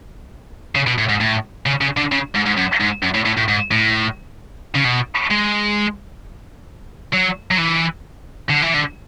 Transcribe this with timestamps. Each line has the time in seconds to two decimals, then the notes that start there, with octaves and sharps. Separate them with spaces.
0.75 C#3
0.87 B2
0.98 A2
1.09 G#2
1.21 A2
1.66 C#3
1.81 C#3
1.97 D3
2.12 C#3
2.35 G#2
2.46 G#2
2.57 F#2
2.80 G#2
3.03 F#2
3.14 A2
3.26 A2
3.37 A2
3.48 G#2
3.71 A2
4.75 C#3
4.85 B2
5.31 G#3
7.13 F#3
7.51 F#3
7.58 E3
8.50 D3
8.62 E3
8.74 D3